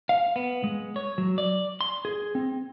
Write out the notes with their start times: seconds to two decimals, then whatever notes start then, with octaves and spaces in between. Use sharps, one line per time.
0.09 F5
0.36 B3
0.64 G#3
0.96 C#5
1.18 F#3
1.38 D5
1.81 C6
2.05 G#4
2.35 C4